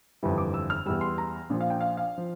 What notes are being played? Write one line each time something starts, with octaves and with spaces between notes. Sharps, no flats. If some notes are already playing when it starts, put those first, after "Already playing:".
G1 F2 E3 G3
D6
E6
F6
E2 E3 G3 E6
C6
A#5
A#1 A#2 F3
F5
G5
F5
F5
F3